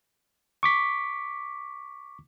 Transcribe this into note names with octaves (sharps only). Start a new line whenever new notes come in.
C#6 D6 B6